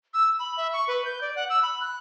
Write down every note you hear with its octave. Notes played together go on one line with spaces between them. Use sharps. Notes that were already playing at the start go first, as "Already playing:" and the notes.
E6
B5
E5
C#6
B4
G6
D5
F#5
E6
B5
F#6